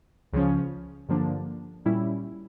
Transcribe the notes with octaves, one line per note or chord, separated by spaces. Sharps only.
C#2 C#3 F3 C#4
G2 D3 F3 A#3 D4
A#2 G3 C#4 E4